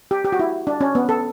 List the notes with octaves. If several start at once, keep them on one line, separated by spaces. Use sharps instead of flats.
G4
G4
F#4
E4
D4
C#4
B3
A4